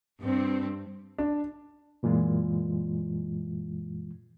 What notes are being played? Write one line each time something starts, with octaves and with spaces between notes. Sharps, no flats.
G2 C4
D4
F#2 A#2 E3 G#3 F4